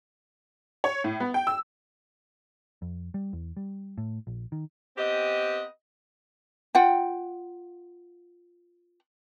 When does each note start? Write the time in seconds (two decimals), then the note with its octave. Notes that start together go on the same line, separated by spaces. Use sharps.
0.84 C#5
1.04 A2
1.20 B3
1.34 G5
1.47 E6
2.82 F2
3.14 G3
3.33 E2
3.57 G3
3.98 A2
4.27 A#1
4.52 D#3
4.98 B3 C4 G4 D#5
6.75 F4 F#5 G5